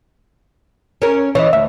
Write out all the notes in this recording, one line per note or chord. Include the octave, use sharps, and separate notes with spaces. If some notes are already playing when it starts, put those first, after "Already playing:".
C#4 A#4
E3 C#5 D#5
D2 E5